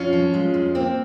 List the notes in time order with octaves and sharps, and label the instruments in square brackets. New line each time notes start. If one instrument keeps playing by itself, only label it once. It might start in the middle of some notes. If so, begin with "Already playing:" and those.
Already playing: [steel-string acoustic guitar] F2 C#4 F4
F3
G#3
F2
A#3 C4